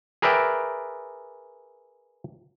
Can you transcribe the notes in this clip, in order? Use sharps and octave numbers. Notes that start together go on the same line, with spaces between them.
G#4 A#4 B4 D5 E5 G5